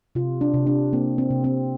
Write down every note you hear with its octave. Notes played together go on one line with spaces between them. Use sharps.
C3 F4
D4
C3
D4
A#3 C4
C4
C3
C4